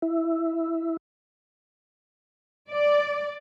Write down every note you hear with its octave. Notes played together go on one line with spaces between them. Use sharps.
E4
D5